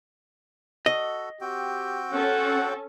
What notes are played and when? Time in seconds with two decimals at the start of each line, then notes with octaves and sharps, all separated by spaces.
0.86 F#4 A4 D#5
1.41 C4 F#4 G4 G5
2.11 C#4 A4 F#5